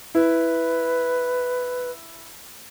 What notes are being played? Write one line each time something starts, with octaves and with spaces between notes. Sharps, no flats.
E4 B4